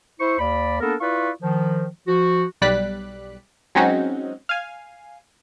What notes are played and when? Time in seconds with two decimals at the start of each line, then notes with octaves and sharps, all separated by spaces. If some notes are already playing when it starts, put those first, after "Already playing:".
0.20 E4 C5 C#6
0.39 D#2 D5 B5
0.81 A#3 B3 D4 A4 A#4
1.01 E4 F4 B4 D5 F5 C#6
1.42 D#3 F3
2.08 F3 F#4
2.61 B1 G3 D5 F#6 B6
3.75 F#3 G#3 C4 C#4 D#4 F#4
4.49 F5 G#5